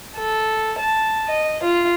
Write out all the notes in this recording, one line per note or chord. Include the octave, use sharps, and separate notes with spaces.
A4
A5
D#5
F4